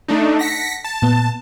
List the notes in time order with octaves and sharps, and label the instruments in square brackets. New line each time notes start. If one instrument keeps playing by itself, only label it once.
[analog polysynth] A3 D4 D#4
[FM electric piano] F#5 A5 [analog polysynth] A#6 B6 C#7
[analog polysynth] A5
[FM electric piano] A#2 B3